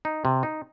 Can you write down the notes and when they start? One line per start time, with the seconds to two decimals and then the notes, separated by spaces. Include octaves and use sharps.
0.05 D#4
0.25 C3
0.43 D#4